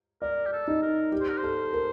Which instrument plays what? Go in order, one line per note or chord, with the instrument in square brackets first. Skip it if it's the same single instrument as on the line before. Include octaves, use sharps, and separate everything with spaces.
[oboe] A#4 [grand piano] D5
[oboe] G4
A4
[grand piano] D#4
[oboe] A#4
[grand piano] G4
[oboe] C5
A#4
C5
[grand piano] A4
A#4